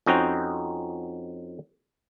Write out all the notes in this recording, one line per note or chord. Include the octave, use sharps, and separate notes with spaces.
F2 C#4 D#4 F#4 C5 G5